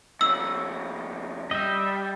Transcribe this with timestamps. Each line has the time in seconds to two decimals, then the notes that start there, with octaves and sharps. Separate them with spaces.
0.21 F2 C#3 E6 F#7
1.51 G3 D#5 E5